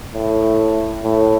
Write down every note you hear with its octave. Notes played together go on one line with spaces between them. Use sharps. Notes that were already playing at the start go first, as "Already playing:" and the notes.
A2
A2